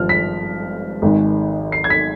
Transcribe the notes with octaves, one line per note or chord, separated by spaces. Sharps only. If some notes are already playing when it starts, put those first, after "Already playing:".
Already playing: G#1 G2 F3 F6
B6
G#1 G#2 D#3 G#3
C7
G#6
B6